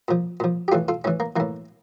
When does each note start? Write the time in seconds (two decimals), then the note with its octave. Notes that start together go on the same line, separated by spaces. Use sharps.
0.08 A#2 F3
0.40 A#2 F3
0.68 G4
0.72 A2 E3 F4 A4
0.88 F4 A4
1.04 A2 E3 C#4
1.20 A#3
1.36 A2 E3 A#3